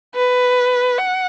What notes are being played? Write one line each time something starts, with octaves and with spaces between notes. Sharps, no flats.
B4
F#5